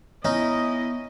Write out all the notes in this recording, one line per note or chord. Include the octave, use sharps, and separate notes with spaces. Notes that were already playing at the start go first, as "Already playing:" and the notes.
B3 C#4 D#4 E4 D#5